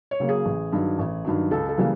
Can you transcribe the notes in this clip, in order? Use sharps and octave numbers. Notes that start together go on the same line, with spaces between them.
C#5
C#3 F#3 A#3
G#4
A1
G2 D#3 F#3
A1
G2 D#3 F#3
C#2 A4
A4
C#3 E3 G3 A#3